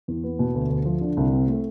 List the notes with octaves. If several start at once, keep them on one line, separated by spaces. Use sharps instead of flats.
E2
B3
B2
D2
D2
F3
D3
C2
C4
A3